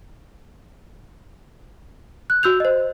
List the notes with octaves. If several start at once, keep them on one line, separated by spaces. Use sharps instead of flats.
F#6
F#4 E6 G6 F7
C5 D#5